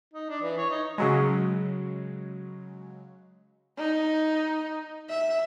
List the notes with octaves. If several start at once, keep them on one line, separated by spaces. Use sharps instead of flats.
D#4
D4
E3
C#5
D#4
C#3 F#3 G#3
D#4
E5